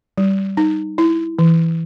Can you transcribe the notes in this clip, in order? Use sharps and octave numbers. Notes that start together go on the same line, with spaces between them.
G3
D#4
E4
E3